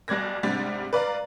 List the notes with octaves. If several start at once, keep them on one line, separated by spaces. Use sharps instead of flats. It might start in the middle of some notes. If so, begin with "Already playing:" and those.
B1 G3 D5 G#6 A#6
G#2 C3 G3 D4 A6 B6
B4 D5 F5 A#5